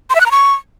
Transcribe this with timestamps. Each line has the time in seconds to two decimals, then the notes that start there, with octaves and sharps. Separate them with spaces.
0.10 C6
0.15 E5
0.21 F#6
0.26 A#5
0.31 C#6